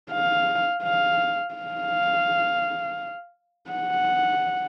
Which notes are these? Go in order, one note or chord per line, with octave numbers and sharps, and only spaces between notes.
F5
F5
F5
F#5